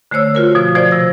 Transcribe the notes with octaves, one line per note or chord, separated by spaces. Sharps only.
D3 A3 C5 C#5 E6
F4 F#4 A#4
B2 F3
F3 C5 D5
C3 A#6